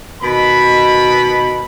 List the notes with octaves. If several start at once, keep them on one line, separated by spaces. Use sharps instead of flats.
B2 D#3 B5